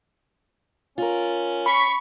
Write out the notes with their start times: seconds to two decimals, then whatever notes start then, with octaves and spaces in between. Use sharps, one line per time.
0.98 C#4 F4 A#4
1.66 B5 C#6 B6